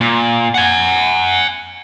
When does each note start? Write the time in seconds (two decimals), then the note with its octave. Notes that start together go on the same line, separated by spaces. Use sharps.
0.01 A#2
0.54 F#5 G#5